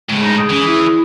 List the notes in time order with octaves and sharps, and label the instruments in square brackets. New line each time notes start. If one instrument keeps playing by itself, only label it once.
[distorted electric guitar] A2 C#3 [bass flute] G#3
[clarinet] D#4
G#4
[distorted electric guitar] E3 [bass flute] C#4
[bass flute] E4